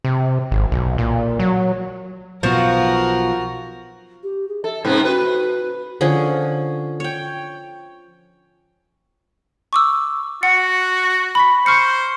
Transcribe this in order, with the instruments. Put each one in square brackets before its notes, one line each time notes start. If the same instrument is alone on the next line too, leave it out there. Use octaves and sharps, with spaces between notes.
[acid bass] C3
G#1
B1
A#2
F#3
[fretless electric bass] B1 B2 B3 [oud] F3 [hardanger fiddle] F#4 A#4
[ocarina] G4
G#4
[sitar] A4 [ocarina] E5
[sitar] G#2 C3 B3 [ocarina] C#4
[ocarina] F#4 [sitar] B4
[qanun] D3 F3 C#4 G#4
C#5 G5
[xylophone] C#6 D6 E6
[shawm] F#4 [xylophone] F#5 C#7
[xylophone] B5 C#6 B6
[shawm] C5 [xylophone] C#6 F6 C#7